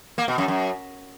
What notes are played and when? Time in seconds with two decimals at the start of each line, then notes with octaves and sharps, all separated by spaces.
0.18 A#3
0.28 B2
0.38 F#2
0.48 F#2